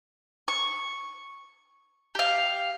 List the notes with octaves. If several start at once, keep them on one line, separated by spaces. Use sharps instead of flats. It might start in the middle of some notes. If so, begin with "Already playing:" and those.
C#6
G4 F5